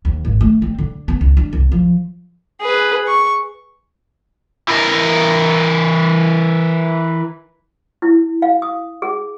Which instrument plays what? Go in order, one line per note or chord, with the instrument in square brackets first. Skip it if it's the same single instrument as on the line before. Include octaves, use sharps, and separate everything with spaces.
[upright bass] D#2
G#1
A3
C4
D3
B3
C#2
D4
C2
F3
[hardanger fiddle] G#4 B4
C#6
[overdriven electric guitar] E3 A#4
[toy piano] E4
F5
D#6
G#4